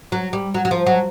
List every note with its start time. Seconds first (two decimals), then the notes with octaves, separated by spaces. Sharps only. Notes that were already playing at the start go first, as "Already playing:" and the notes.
0.12 F#3
0.33 G3
0.54 F#3
0.65 F#3
0.71 F3
0.86 F#3